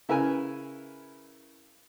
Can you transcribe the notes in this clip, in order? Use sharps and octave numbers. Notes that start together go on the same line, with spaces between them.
C#3 E4 A#4 B4 G#5